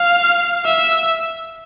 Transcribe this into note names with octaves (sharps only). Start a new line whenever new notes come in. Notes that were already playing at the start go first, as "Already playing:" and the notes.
Already playing: F5
E5